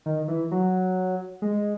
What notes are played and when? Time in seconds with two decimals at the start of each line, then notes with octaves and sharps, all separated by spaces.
0.06 D#3
0.28 E3
0.51 F#3
1.42 G#3